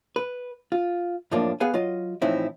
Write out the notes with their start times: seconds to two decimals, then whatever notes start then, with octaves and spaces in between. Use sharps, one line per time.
0.16 B4
0.72 F4
1.31 F#2 A2 F3 A#3 D4
1.60 B3 G#4 B4 F5 F#5 G#5
1.74 F#3 F4 D#5
2.22 A2 E3 F3 C4 D#4 E4